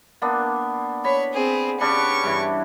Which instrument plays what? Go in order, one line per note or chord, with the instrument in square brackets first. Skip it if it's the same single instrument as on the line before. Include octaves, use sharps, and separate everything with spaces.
[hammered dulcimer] A#3 B3 D4
[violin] C#5 [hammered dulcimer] B5
[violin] C4 G#4
[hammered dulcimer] C#3 D4 B5 [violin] G4 C#6
[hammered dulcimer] G2 E3